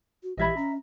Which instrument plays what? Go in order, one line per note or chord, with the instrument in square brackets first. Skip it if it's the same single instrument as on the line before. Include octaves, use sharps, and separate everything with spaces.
[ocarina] F#4
[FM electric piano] A#1 E3 G#6 [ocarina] G4 [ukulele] D#5 E5 B5
[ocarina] C#4 [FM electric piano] A#5